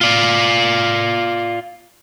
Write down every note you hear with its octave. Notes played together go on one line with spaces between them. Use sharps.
F4 D5